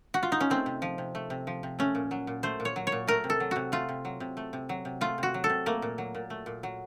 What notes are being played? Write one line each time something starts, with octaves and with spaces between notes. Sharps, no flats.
F#4
F4
D#4
C#4
A3 C4
C3
F3
C3
A3
C3
F3
C3
A3 C#4
A#2
F#3
A#2
A3 C5
A#2
C#5
F#3
C#5
A#2
A3 A#4
C3
A4
F#3
C3 F#4
A3 F4
C3
F#3
C3
A3
C3
F#3
C3
A3 F4
C3 F#4
F#3
A4
C3
A3 A#3
A#2
F#3
A#2
A3
A#2
F#3